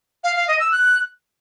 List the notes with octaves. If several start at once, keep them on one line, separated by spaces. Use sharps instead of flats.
F5
F5
D#5
E6
F#6